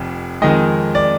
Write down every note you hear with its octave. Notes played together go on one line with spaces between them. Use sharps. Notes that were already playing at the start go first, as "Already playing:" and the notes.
Already playing: F1 F2
F2 D#3 G#3 D#5
D5